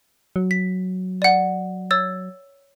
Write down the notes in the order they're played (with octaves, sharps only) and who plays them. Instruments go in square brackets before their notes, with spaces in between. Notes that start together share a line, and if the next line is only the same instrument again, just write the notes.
[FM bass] F#3
[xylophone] B6
D5 F#5
C#5 E6 A6